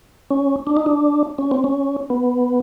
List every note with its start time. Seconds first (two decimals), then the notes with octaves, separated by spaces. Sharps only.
0.31 C#4
0.67 D4
0.77 D#4
0.86 D4
1.38 C#4
1.51 C4
1.64 C#4
2.10 B3